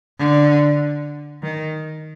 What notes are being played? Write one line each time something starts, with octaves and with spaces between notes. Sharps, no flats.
D3
D#3